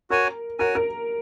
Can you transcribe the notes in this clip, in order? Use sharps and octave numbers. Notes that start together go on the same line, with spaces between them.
F#4 A#4 C#5 G#5
F#4 A#4 C#5 G#5
A#4